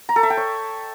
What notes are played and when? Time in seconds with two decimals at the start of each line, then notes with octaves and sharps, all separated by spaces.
0.09 A#5
0.16 A4
0.23 E5
0.30 G5
0.37 C#5